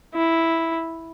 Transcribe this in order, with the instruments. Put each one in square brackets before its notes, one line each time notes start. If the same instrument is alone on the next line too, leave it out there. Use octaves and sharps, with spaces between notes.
[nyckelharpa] E4